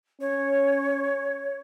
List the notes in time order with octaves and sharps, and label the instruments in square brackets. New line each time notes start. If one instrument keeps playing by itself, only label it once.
[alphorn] C#4 [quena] C#5